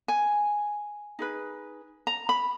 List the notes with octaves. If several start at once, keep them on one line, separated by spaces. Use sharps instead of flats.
G#5
D#4 G#4 B4
A#5
B5